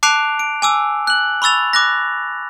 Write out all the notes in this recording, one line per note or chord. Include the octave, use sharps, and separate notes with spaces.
A5 D6 F#6 C7 D7 F7
D7
G#5 D6 E6
F#6 F#7
B5 C#6 E6 A6 F7
D6 F#6 A#6